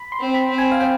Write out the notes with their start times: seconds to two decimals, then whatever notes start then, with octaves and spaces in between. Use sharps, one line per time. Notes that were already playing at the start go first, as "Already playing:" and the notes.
Already playing: B5
0.12 C6
0.20 C4
0.34 B5
0.50 C4
0.58 G#5
0.72 F5
0.80 G5